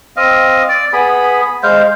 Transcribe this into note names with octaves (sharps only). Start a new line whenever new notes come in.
C4 D#5 F5
D5
B3 G#4 B5
G#3 C5 F5